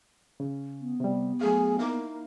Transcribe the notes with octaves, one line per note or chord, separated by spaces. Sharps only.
C#3
B3
C3 G3
F#3 A3 G#4 F5
A#3 D#4 E4 F5